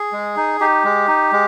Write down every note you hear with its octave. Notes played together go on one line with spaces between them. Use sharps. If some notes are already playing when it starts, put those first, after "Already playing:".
Already playing: G#4
G#3
D#4
D#4 G4
G#3
D#4
G#3